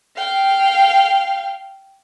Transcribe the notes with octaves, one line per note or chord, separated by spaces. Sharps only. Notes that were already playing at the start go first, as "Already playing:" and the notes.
F5 G5